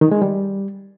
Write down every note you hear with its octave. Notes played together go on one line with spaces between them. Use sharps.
D#3
G#3
G3